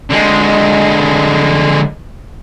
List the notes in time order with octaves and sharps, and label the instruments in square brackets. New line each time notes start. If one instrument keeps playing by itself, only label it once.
[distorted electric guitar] D3 G#3